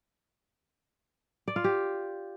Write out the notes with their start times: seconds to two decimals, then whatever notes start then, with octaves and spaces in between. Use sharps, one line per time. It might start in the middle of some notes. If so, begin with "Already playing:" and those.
1.48 D5
1.56 F4
1.64 G4